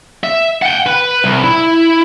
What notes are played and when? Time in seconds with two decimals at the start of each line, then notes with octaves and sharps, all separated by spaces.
0.24 E5
0.62 F#5 G5
0.87 B4
1.24 C2
1.44 E4